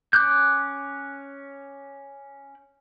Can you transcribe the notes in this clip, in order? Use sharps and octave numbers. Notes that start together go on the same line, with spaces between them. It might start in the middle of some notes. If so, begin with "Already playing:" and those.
C#4 D6 F#6 G6